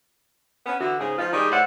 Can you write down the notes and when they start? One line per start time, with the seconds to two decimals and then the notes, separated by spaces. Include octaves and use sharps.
0.66 B3 C#4
0.79 D3 E3 B3 F#4
0.99 G#2 C#3 G#4
1.18 F3 B3 D#4 F4
1.32 D#3 G3 D#4 G#4
1.50 A2 E4 C5 D5 F#5